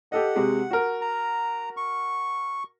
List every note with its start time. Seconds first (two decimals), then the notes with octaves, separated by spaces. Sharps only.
0.12 G4 A4 D#5 F#5
0.36 C3 G#3 F#4
0.71 F#4 A#4
1.01 A#5
1.77 C#6